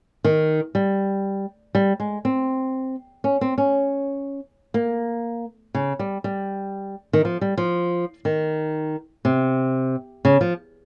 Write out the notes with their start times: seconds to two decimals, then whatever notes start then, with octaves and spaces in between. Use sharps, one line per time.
0.24 D#3
0.75 G3
1.75 G3
2.00 G#3
2.25 C4
3.24 C#4
3.41 C4
3.58 C#4
4.74 A#3
5.75 C#3
5.99 G3
6.24 G3
7.13 D#3
7.25 F3
7.41 G3
7.57 F3
8.25 D#3
9.25 C3
10.25 C#3
10.41 F3